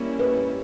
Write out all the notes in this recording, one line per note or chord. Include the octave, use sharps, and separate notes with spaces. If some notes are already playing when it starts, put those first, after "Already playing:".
Already playing: G3 A#3 C#4 E4
B4